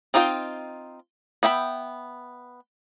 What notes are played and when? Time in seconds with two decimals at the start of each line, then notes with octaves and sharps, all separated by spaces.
0.14 C4 D#4 F4 A4 G5
1.43 B3 E5 G5 B5